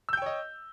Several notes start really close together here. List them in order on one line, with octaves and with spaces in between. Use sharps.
E6 G6 G5 C#5 D#5